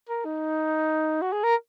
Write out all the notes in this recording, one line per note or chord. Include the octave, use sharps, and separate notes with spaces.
A#4
D#4
F#4
G#4
A#4